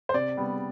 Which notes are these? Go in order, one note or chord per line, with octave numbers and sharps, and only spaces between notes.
C5
C3 D5
G3 B3